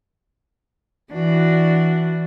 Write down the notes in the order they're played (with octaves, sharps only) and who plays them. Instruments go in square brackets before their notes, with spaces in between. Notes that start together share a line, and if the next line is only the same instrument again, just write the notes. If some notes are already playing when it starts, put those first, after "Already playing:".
[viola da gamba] E3 [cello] D4 F#4